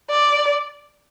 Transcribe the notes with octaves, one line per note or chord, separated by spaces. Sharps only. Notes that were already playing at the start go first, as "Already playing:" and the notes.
D5